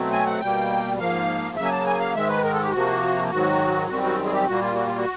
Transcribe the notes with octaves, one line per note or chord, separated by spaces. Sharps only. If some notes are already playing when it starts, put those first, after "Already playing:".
Already playing: B2 F#3 A3 C4
G#5
F#5
B2 G3 A#3 G5
G#2 F3 A#3 F5
C#3 F#3 A#3 E5
G#5
A5
G#5
F5
G#2 D#3 G#3 E5
B4
A#4
A4
G4
C3 F3 A#3 F#4
G#2 D#3 F#3 F#4
F#2 D#3 G3 C4 F#4
F#4
G#4
G4
A#2 G3 A#3 F#4
F4
F#4
F4
F#4